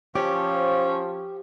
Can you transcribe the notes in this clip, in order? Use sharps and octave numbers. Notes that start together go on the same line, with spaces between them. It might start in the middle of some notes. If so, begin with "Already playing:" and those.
F3 C#4 G4 C#5 D6